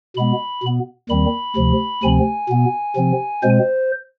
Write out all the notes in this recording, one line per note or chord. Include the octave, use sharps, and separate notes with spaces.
B2 G#3 B3 B5
B2 B3
D#2 D#3 G3 C4 B5
D2 C3 F3
D2 C3 F3 C4 G#5
B2 B3
C3 F3 C4
B2 G#3 C4 C5